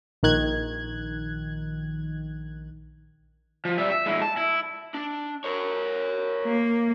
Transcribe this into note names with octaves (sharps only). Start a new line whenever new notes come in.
A#1 D#3 F#6 G#6
F3
G3 E5
E5
G#3 E4
A5
E4
D4
A#4 C#5
A#3